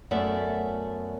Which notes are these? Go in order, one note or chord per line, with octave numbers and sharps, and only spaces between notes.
F#2 A3 B3 D5 E5